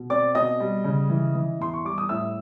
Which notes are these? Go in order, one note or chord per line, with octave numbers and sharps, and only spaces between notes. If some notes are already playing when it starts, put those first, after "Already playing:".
Already playing: B2
C4 D5 D6
B2 D#5 D#6
G3
C#3
E3
E3
E2 C6
C#6
G3 D6
D#6
A2 E5 E6